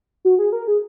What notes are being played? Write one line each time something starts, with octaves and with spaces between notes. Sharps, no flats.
F#4
G#4
A#4
G#4